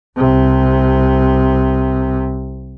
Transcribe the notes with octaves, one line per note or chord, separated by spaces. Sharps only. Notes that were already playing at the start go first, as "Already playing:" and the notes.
C2 C3